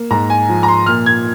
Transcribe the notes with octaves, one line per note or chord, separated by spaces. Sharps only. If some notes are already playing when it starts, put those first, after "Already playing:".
Already playing: A#3
G#2 A#5
G#5
F3
A#5
C6
A#2 F6
G#6